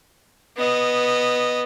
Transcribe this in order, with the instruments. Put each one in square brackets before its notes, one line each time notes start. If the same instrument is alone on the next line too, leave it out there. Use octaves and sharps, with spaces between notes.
[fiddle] B3 D#5